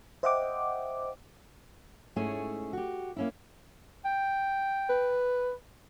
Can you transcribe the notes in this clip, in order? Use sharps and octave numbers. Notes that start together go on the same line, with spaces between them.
C5 D#5 E5 F#5 G5 D6
G#2 A3 C#4 E4 G#4 G#5
F#4 G4
A#3 C#4 E4
G5
B4